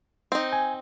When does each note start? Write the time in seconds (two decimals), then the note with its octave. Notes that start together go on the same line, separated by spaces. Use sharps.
0.32 C4 D#4
0.53 G#5